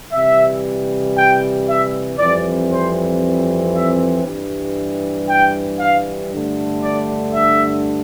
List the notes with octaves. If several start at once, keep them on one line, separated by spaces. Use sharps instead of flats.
C3 E3 G3 E5
G5
E5
F2 E3 G3 C4 D5
C5
E5
G2 E3 G3
G5
F5
G2 D3 A3
D5
E5